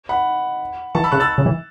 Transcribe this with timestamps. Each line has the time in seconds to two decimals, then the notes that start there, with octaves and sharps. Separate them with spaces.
0.09 F#5 B5
0.95 E3 A5 C#6
1.04 B5 E6
1.12 C#3 C#6 F#6
1.20 E6 A6
1.38 C#3
1.46 E3